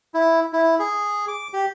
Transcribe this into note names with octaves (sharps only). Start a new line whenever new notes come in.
E4
E4
G#4
D6
G4